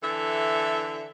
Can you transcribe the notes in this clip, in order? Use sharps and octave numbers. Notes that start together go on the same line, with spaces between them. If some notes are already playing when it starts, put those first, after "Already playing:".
D3 E3 A4 E5